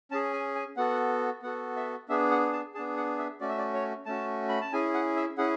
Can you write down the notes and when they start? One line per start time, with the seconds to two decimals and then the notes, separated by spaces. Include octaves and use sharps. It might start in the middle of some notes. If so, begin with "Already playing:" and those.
0.11 C#4 A5
0.14 G#4
0.33 G#5
0.55 G#5
0.77 B3 F#4 A4 F#5
1.42 B3 F#4 A4 F#5
1.76 E5
2.09 B3 D4 G#4 E5
2.31 F#5
2.53 A5
2.74 B3 D4 G#4 A5
2.97 F#5
3.18 E5
3.41 A3 C#4 F#4 D5
3.49 E5
3.58 D5
3.74 C#5
4.06 A3 C#4 F#4 A5
4.49 B5
4.61 A5
4.73 C#4 E4 G#4 G#5
4.94 F#5
5.16 E5
5.38 C#4 E4 G#4 F#5